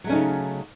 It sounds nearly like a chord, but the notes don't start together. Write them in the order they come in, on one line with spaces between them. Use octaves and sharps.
F#3 A3 C#4 D#4 C#3